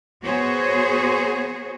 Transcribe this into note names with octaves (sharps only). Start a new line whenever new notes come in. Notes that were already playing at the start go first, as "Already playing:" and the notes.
B3 F#4 G#4 C5 C#5